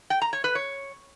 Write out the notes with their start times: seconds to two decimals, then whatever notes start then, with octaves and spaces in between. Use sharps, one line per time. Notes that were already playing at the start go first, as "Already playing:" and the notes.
0.10 G5
0.22 A#5
0.33 C#5
0.44 B4
0.55 C#5